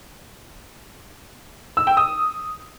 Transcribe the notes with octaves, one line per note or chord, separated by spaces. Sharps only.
E6
G5
D#6